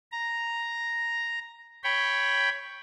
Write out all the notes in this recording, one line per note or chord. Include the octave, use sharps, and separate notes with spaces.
A#5
C#5 G5 B5